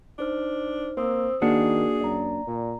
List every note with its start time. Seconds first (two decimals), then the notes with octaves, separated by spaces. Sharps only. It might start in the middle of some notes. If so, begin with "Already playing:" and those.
0.19 D4 D#4 C5 F6
0.97 A#3 C4 C5 D#6 E6
1.42 D#3 A#3 D4 F#4 G#4 F#5
2.01 F#2 D5 A#5
2.47 A#2